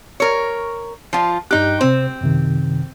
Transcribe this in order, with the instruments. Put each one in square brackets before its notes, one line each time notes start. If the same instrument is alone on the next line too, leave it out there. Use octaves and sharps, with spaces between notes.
[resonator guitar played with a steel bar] A#4 C#5
F3 F4
[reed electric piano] G2 F#6 [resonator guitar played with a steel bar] D#4 G4
[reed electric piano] C3 C5 [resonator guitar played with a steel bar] C4
[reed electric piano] F#2 C3 D#3